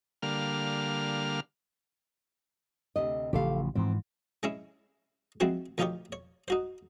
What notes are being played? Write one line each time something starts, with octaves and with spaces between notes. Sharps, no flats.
D3 G3 A#3 F5 F6
D2 C3 D#5
A1 C#3 F3 G4 A4 F5
G#2 E3 F3 C4
G#3 C#4 E4
F3 G#3 C4 E4 F#4
D2 F3 D#4 F4 G4 C#5
C#5
D#4 F#4 C5